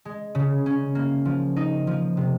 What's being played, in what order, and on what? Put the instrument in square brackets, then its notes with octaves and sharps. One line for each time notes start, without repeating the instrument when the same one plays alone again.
[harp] G#3
C#3
C#4
A#3
F3
D#4
F3
C3